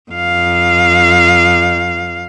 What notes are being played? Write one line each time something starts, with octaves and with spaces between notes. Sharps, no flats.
F2 F5